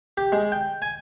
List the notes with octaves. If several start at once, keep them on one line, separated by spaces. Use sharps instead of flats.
G4
G#3
G5
G#5